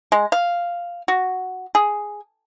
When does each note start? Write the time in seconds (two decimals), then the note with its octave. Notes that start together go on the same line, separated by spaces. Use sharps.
0.12 G#3
0.32 F5
1.08 F#4
1.75 G#4